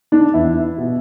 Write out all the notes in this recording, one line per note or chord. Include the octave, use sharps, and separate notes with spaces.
D4
E2 E4
B2